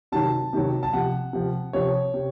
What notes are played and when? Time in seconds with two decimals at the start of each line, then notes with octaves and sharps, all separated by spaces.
0.12 C3 D#3 F#3 A5
0.53 C3 D#3 F#3
0.83 A5
0.93 C3 F3 F#5
1.33 C3 F3
1.73 C3 F3 C#5
2.14 C3